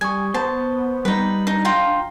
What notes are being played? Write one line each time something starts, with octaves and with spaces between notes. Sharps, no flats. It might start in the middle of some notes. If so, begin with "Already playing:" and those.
G3 G#5 C#6 D#6 G#6
B3 C5 A5
G3 D#4 B4
D4 D#4
F4 F5 G5 A#5